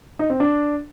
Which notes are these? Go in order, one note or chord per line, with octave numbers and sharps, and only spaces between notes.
D#4
C4
D4